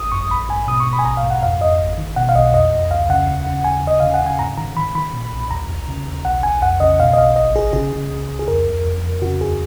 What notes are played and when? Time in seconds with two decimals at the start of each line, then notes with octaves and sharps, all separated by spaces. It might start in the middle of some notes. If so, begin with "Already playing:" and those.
Already playing: G#1 D#6
0.12 F#2 C#6
0.30 A#1 B5
0.49 G#2 G#5
0.68 B2 D#6
0.80 C#6
0.87 B2
0.93 B5
0.99 G#5
1.05 A#1 A#5
1.17 F5
1.23 G#2
1.30 F#5
1.43 F2 F5
1.61 F2 D#5
1.79 G#1
1.98 D#3
2.16 B2 F#5
2.29 F5
2.35 B1 D#5
2.53 F2 D#5
2.72 F2
2.90 C#2 F5
3.09 C#3 F#5
3.27 D#2
3.47 C#3
3.64 D#2 G#5
3.84 D#2 D#5
4.00 C#3 F5
4.14 F#5
4.21 C#3
4.26 G#5
4.39 G#2 A#5
4.57 D#3 A#5
4.76 D#3 B5
4.95 D#3 B5
5.13 A#2
5.33 B1
5.51 D#2 A#5
5.69 D#2
5.88 C#3
6.07 D#2
6.25 B1 F#5
6.43 B1 G#5
6.62 F2 F#5
6.80 C#3 D#5
6.99 B2 F5
7.13 D#5
7.18 B1 F5
7.36 G#1 D#5
7.55 G#1 G#4
7.73 C#3 G#4
7.93 C#3
8.10 C#2
8.29 C#2
8.39 G#4
8.48 F2 A#4
8.67 F2
8.84 F2
9.04 F2
9.22 C#3 F#4
9.41 D#2 G#4